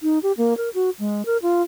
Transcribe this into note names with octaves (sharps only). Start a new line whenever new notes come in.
D#4
G4
A#3
A#4
F#4
G#3
A#4
F4